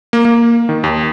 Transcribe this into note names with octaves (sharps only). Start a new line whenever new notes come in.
A#3
A#3
D#3
D#2